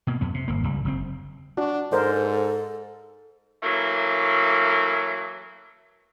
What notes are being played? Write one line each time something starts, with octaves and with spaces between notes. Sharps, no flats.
B2 A#3
F2 B3
C3
G1 A#3
C#2 G3
F#1 B2 C4
D4 F#4
G#2 A4 A#4 C5 D5
E3 F#3 A3 A#3